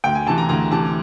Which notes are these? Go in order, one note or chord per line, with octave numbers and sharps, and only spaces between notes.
D2 G5
G#5
C3 E3 A5
A#5
D2 A#5
C3 E3 A5